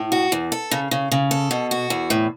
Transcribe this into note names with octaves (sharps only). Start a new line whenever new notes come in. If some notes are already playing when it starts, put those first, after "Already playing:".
Already playing: A2
F#4
E2
A4
C#3
C#3
C#3
A4
B2
F#4
E2
A2